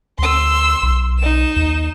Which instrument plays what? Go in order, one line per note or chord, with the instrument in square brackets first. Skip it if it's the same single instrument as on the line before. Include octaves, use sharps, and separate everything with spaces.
[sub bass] D2 [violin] C6 E6
[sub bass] B1
[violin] D#4 E7
[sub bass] D#2